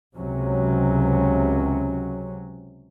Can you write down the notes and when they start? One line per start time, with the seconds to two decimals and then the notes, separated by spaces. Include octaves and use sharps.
0.16 C#2 C3 F#3 C#4